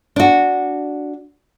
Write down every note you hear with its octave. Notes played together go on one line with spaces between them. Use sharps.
D4 F#4